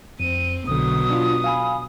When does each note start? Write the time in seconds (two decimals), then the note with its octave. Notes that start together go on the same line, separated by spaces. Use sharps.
0.20 F2 C4 D#7
0.67 B1 B2 D3 F#3 D#6
1.10 D4 F4
1.44 F5 G#5 B5